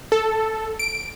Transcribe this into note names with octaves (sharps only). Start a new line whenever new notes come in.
A4
D7